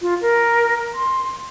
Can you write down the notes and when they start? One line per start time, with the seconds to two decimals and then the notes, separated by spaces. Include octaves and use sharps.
0.01 F4
0.21 A#4
0.94 C6